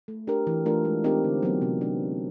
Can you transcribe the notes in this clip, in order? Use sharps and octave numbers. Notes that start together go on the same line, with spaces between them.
A3
D4 G4 A#4
E3
A3 D4 F4 A#4
G#3
C4 D#4 G4 A#4
D3
F#3 B3
C3
D4